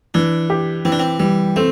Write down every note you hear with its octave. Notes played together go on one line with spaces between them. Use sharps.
E3 D4
G4
E3 C4
D4
C4
E3 G3
A3 C4